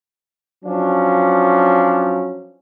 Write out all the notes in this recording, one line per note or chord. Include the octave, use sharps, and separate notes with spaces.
F3 F#3 C#4 D4